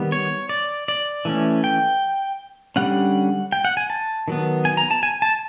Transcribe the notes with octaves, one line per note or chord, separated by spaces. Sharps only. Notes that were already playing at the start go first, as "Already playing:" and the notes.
Already playing: D#3 G3 B3
C#5
D5
D5
E3 A3 C#4
G5
D3 G3 A#3 C#4 F#5
G5
F#5
G#5
A5
D#3 F#3 B3
G#5
A#5
A5
G#5
A5